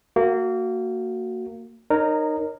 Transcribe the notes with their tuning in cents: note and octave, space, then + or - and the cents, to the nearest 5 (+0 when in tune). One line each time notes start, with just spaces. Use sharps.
A#3 -25 F#4 +0
D#4 -20 A#4 +0 C#5 +0